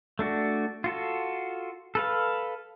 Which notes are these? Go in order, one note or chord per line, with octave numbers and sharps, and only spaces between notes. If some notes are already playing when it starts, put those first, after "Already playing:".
A3 D4 F#4
F4 F#4 A4
A4 B4 F5